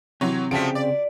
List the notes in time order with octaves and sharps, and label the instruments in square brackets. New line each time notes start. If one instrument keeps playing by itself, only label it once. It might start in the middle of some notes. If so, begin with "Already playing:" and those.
[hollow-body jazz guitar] C3 [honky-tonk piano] E3 F#3 C#5
[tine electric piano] C#3 C4 [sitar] F3 F#3 A3 [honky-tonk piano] B6 D7
[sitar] D5